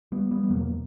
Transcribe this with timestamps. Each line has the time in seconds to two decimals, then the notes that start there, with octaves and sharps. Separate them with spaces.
0.12 G3 B3
0.31 G3 B3
0.43 G3
0.49 E2 B2 F#3 A#3